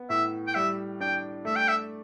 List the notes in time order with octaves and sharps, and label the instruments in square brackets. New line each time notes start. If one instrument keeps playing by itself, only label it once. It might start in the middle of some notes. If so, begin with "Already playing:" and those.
Already playing: [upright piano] B3
[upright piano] A2 [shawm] E5
[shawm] G5
[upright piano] G3 [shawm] E5
[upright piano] D4 [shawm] G5
[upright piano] A3 [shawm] E5
[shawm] G5
E5